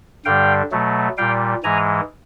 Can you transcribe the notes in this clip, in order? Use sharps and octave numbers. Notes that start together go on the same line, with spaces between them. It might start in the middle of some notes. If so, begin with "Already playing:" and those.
G2 D3 G3 F5 G5
B2 F#3 A3
A#2 G3 F5 G5
G#2 E3 G#3 G#5 A#5